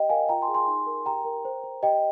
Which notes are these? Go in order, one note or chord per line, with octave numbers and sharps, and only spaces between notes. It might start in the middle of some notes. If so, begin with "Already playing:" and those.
Already playing: G4 D#5 G5
A#4 F5 G#5
F4 G5 A#5
G#5 C6
G#4
G#5 C6
D#4
A#4
G4 G5 A#5
A#4
C5
C5
G4 D#5 G5